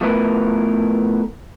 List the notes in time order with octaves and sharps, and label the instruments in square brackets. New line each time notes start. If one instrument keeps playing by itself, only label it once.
[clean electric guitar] F3 A3 B3 E4 A#4 B4